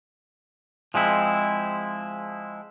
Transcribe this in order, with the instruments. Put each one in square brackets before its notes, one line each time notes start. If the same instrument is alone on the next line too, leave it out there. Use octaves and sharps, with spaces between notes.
[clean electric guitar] F3 G#3 C4 E4